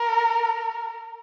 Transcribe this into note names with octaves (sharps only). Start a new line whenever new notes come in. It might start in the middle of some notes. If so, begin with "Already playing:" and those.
Already playing: A#4